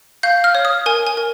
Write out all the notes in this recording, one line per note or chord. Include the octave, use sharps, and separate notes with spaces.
F5 G6
F6
C#5
D#6
A#4 G#5
G#5
A#4